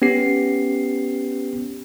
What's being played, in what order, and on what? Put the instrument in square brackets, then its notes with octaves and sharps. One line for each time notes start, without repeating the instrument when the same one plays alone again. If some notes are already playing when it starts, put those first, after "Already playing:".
[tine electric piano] B3 C#4 G4 C7